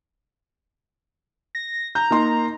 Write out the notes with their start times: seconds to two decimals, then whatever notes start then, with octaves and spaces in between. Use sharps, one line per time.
1.55 A#6
1.95 A#5 G6
2.11 A#3 D#4 C6